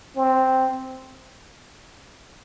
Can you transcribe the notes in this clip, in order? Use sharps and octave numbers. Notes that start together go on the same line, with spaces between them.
C4